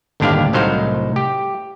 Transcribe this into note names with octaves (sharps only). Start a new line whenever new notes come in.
G1 D#2 A2 D4 G4 F5
C2 A2 F#3 D#4 C5 F5
G4